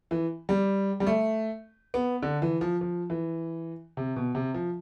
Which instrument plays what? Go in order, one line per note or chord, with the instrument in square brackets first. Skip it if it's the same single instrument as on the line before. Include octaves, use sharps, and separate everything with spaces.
[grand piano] E3
G3
G3
A3
B3
D3
E3
F3
F3
E3
C3
B2
C3
F3